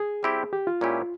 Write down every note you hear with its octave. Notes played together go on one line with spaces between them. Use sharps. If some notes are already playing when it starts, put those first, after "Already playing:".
Already playing: G#4
G3 C4 E4 G4
G4
F4
A#2 G#3 C#4 E4 G4